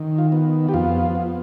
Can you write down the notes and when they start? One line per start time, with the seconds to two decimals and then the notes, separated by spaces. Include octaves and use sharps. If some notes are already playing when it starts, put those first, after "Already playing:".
Already playing: D#3
0.18 F4
0.32 B3
0.69 G4
0.74 F2 F4
1.15 B3